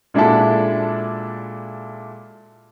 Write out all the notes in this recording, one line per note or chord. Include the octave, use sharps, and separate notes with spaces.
A#2 G#3 D4 E4 F#4 A4